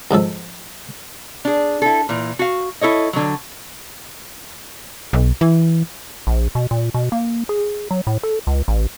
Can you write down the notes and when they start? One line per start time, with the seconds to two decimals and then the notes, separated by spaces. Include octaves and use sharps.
0.11 C2 G#2 F3 A4
1.45 D4 G#4
1.82 E4 A4
2.09 A#2 E3
2.39 F#4 F5
2.81 E4 A4 C#5 D#5
3.13 D3 F#3
5.13 B1
5.41 E3
6.27 A#1
6.55 B2
6.71 A#2
6.94 B2
7.12 A#3
7.49 G#4
7.91 F#3
8.07 A2
8.23 A4
8.47 C#2
8.68 A1